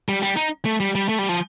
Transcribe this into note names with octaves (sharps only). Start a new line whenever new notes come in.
G3
G3
D#4
A3
G3
G3
A3
G3
F3